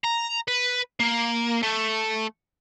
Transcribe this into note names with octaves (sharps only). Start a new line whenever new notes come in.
A#5
B4
A#3
A3